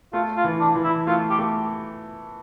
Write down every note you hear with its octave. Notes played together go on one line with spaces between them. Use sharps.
A3 F4
F4
E3
D4
E3
E4
A3 F4
G4
A3